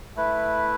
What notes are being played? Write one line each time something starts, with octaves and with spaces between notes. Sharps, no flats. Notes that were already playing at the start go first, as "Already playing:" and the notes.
A3 E4 B4